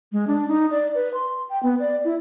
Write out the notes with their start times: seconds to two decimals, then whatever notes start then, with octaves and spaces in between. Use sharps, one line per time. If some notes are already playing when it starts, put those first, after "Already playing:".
0.12 G#3
0.27 D4
0.48 D#4
0.71 D5
0.95 B4
1.14 C6
1.49 G5
1.63 B3
1.80 D5
2.04 E4